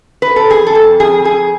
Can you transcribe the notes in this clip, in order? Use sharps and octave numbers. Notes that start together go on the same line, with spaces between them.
B4
A4
F2 G#4
A4
F2
F2 G#4
F2 G#4